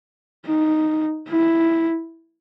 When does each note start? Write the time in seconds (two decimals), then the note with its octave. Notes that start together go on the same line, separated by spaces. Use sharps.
0.46 D#4
1.29 E4